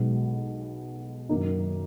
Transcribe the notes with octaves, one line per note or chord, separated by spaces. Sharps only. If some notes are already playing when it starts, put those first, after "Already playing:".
Already playing: B1 B2 G#3
F#2 D#3 A#3 D#4